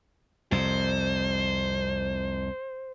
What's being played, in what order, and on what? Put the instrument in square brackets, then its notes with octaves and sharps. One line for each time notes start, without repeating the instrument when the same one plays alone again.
[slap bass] C2 F2 [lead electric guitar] C5